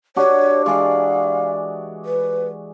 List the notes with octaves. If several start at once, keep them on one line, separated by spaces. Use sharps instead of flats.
D4 F#4 G4 C#5
E3 G#3 D5 F5
B4